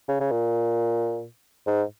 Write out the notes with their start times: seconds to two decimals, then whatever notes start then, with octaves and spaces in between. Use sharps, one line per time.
0.08 C#3
0.20 C#3
0.31 A#2
1.67 G#2